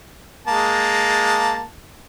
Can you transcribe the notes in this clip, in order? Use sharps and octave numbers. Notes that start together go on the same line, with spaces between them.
G#3 A#3 A5